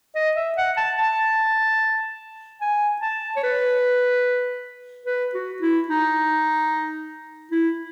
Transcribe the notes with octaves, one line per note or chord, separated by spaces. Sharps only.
D#5
E5
F#5
A5
A5
G#5
A5
C#5
B4
B4
F#4
E4
D#4
E4